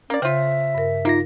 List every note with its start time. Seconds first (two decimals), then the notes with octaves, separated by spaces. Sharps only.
0.10 A#3 C#4 D5
0.22 C#3 C4 F4 E5
0.75 G2 A#4
1.05 A#3 D#4 F4 A#6